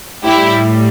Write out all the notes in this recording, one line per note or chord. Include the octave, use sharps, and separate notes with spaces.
A2 G3 E4 G4